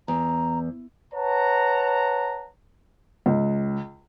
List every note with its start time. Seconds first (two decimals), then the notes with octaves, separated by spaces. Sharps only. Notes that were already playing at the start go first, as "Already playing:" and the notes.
0.08 E2 A#5
1.14 B4 C#5 F#5 A5 A#5
3.26 C#2